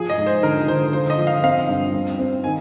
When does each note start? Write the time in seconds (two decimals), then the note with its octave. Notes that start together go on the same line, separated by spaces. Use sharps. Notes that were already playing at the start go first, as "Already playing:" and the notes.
Already playing: F3 G#4
0.10 D#5
0.18 G#2
0.27 C5
0.42 D3 A#4
0.68 D3 C5
0.93 F4 C5
1.10 D#5
1.18 F3
1.27 F5
1.43 C4 F5
1.69 G2
1.94 C4
2.19 C4
2.44 D#3 G#5